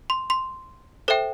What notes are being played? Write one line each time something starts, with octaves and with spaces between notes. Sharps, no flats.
C6
C6
A4 C5 E5 G5